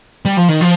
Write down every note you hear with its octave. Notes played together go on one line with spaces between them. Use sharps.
G3
F3
D#3
F3